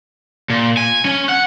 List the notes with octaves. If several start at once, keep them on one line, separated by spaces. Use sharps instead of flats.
A#2
G#5
C#4
F#5